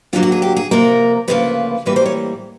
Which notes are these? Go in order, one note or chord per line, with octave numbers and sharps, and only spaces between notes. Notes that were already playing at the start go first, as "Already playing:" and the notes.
D2 D3 F#3 A#3 F4
F#4
G#4
G4
G#4
C3 F3 A#3 A#4
D2 C#3 F3 A#3 B4
A2 E3 G3 A#3 B4
C5
C#5